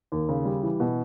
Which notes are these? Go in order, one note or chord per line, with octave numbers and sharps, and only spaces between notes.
D#2
C#3
G3
E3
B2